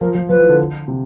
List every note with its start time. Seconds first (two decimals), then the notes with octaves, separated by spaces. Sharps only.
0.01 F3 A#4
0.15 F3
0.29 F3 B4
0.39 E3
0.49 D3
0.88 C3